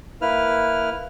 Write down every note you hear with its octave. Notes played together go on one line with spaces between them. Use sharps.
A#3 E4 B4 F6